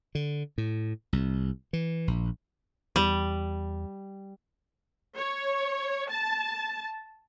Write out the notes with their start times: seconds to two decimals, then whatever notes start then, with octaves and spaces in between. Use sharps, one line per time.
0.15 D3
0.58 A2
1.13 C2
1.73 E3
2.07 A#1
2.96 E2 G3
5.17 C#5
6.09 A5